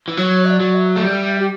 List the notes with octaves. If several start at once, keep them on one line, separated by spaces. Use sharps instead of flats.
E3
F#3 C#5
E5
D5
F#3
E5
A3
G3 E5
G4